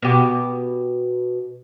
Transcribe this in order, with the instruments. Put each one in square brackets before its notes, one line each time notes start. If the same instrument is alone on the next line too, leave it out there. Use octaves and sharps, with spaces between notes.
[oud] B2 G4